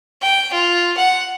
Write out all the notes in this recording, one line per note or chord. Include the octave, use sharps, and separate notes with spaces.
G5
F4
F#5